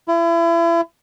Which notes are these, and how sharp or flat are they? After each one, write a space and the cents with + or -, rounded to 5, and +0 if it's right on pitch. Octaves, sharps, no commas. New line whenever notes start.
E4 +35